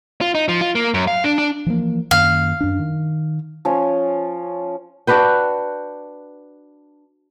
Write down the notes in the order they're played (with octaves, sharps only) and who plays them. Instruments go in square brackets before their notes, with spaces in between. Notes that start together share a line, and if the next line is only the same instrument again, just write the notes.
[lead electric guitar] F4
D#4
F3
F4
A#3
F#2
F5
D4
D4
[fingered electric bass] E3 F3 A#3
[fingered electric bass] F#2 D#3 A#3 [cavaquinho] F5
[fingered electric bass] F#2 D4
D#3
[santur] F3 C#4 C#5
[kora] D4 F#4 B4 G5